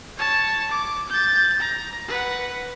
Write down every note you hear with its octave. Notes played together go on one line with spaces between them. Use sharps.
C#5 A5
D6
G6 A6
A#5
B4 F#5